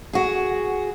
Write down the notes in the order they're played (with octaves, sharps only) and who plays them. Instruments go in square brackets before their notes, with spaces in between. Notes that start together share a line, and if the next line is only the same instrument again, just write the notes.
[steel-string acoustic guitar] F#4 G#4